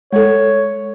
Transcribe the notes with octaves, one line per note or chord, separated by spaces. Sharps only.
G#3 A4 C#5